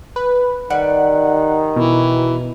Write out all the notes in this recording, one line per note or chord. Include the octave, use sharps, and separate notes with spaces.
B4
D#3 G3 F#5
B2 E3